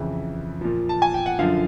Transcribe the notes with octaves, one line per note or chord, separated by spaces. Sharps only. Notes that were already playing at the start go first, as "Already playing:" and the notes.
Already playing: F2 C#3 E3
A#2 F3
A5
G#5
G5
F#5
F#2 D3 F3 F5